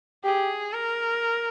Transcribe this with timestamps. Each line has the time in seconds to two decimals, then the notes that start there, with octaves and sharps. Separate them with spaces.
0.24 G4 G#4
0.73 A#4